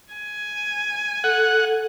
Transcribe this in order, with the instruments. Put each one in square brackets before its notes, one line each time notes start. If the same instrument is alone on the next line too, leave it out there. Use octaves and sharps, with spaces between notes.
[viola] G#5
[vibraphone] A4 [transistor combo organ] F#5